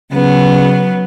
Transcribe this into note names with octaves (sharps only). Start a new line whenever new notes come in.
C#3 F#3 B3